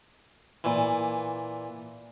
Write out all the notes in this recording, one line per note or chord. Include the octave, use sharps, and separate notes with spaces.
A#2 E3